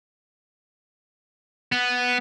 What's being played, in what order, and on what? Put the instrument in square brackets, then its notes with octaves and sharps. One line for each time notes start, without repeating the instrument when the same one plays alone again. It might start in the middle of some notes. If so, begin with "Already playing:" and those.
[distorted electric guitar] B3